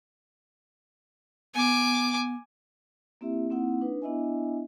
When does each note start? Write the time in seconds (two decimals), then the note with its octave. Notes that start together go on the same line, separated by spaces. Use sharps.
1.55 B3 G#5 D6
3.21 A#3 C4 E4 G4 E5
3.50 A#3 C4 D#4 E4 F#5
3.81 D4 D#4 B4
4.02 B3 D4 E4 D#5 E5 G#5